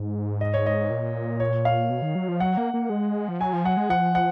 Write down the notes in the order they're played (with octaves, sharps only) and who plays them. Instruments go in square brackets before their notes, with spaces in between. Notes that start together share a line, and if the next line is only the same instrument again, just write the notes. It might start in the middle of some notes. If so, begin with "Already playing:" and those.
Already playing: [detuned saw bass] G#2
[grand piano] D#5
C#5
D#5
[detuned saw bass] A#2
[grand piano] C#5
F5
[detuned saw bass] B2
D#3
F#3
F3
[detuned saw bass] F#3 [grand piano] F#5
[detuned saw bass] A#3
A#3
G#3
F3
[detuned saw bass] F#3 [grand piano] G#5
[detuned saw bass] F3
[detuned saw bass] F#3 [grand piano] F#5
[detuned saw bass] G#3
[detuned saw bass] F3 [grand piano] F#5
[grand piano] F#5